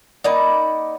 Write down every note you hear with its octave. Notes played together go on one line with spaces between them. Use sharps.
A#3 D#4 D5 F#5 B5